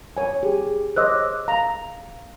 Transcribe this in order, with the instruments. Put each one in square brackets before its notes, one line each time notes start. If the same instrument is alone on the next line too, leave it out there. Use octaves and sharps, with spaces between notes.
[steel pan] C#5 G#5
[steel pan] G4 [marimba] G#4
[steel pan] C5 C#5 D#5 [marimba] D6 E6 F#6
[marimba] F5 [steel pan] A#5